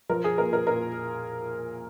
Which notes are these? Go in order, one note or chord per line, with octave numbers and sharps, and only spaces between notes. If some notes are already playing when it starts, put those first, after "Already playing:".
F3 A#4
G#4
A#2 A#4
A#4
A#2 A#4